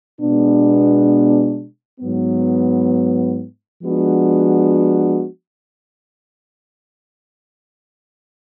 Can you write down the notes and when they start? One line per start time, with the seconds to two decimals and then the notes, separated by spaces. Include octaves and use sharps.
0.21 B2 G#3 B3 D4
2.01 G#2 F#3 B3
3.82 F3 G#3 B3 D4 F#4